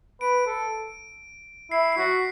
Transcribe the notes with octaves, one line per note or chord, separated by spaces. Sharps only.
B4 D7
A4
E4 C7
C7
F#4 B6